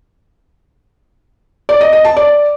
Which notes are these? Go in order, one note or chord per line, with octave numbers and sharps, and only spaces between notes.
D5
D#5
D#5
A5
D5